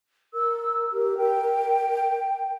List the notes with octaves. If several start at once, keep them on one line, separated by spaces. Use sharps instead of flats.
A#4 E6
G4
G5